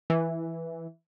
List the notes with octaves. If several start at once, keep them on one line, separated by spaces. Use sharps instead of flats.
E3